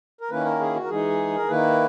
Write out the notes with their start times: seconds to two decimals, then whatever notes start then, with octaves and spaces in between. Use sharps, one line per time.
0.21 A#4
0.30 D#3 A#3 C#4 E4 B4
0.45 A#4
0.60 G#4
0.75 F#4
0.84 A#4
0.89 E3 G#3 D#4 G#4
1.36 A#4
1.48 D#3 A#3 E4 B4